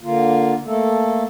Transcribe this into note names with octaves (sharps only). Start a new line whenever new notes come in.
D3 A#3 F4
A3 A#3 A4